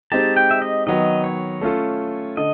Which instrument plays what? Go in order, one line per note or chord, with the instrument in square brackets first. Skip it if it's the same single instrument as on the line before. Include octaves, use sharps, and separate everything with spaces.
[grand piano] G#3 C4 D#4 G4 [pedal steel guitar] A5
[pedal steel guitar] G5
E5
D#5
[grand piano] D#3 F#3 B3 [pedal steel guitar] D#5
[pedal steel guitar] C#5
[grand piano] A3 C#4 F4 A4
[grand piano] D3 [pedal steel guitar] D#5